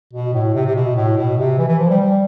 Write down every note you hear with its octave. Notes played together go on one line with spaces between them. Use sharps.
B2
A2
C3
C3
B2
A2
B2
C3
E3
E3
F3
G3
G3